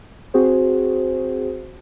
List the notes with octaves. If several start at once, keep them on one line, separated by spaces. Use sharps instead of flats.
C4 F#4 G#4 C5